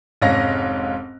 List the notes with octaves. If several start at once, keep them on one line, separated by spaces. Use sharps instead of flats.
F1 G#2 C#4 F5 A#6